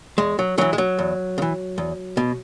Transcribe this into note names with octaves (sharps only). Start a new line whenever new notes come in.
E2 G#3
F#3
C#3 E3 F#3
G#3
F#3
E2
C#3
E3
E2
B2